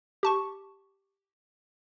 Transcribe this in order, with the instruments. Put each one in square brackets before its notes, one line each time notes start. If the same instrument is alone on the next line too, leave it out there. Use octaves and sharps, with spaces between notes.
[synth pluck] G4 A5 C#6